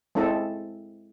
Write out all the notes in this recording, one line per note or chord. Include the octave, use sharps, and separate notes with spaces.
G#3 C4 E4 A4